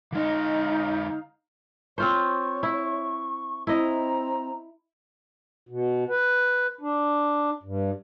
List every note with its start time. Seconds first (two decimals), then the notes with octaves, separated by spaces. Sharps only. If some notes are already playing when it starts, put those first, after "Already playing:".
0.12 D3 G#3 D#4 D#5 F5
1.98 C4 F4 C5 C#5 C#6
2.63 E4
3.67 C4 E4 D#5 A#5
5.69 B2
6.09 B4
6.81 D4
7.63 G2